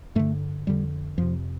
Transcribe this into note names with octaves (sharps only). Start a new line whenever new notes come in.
G2 D3 A3
F2 D3 G3
F2 C3 F3